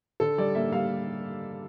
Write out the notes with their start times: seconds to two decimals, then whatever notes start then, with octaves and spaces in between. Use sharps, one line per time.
0.20 D3 A4
0.38 G3 D5
0.55 A#3 E5
0.72 G3 F5